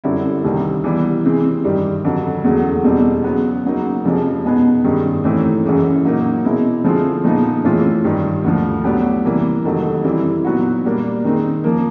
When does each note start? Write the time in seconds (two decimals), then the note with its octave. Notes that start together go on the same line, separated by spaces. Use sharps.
0.04 F#2 D3 G3 C4 E4
0.44 C2 C3 D#3 G3 C4
0.84 E3 G3 B3
1.24 C3 E3 G#3 C4
1.65 G2 D#3 G3
2.05 F2 D3 F#3
2.44 E2 C#3 F#3 A3
2.84 E2 B2 G3 C4
3.24 C#3 F#3 B3
3.64 C#3 F#3 A#3 D#4
4.05 F2 C3 F3 G#3 C#4
4.44 B2 G#3 B3 D#4 G#4
4.84 G2 D#3 G#3 C#4
5.24 A2 E3 A3 C4 D#4
5.64 F#2 C#3 E3 G#3
6.05 A#2 F#3 A#3 D#4
6.45 B2 G#3 C4 E4
6.84 D3 F3 G#3 C4 F4
7.24 A#2 F3 G#3 B3 D#4
7.64 A2 E3 G#3 C4 F4
8.05 G2 D#3 G3
8.44 D2 D3 F3
8.84 A2 F#3 B3 D4 G4
9.25 C3 E3 G3 A#3
9.64 F2 C3 D#3 F#3 A3
10.04 E3 G3 C4 E4
10.44 A#2 F#3 B3 D#4 F#4
10.84 A#2 G3 A#3 D4
11.24 D#3 G#3 C4 D#4
11.64 F3 A#3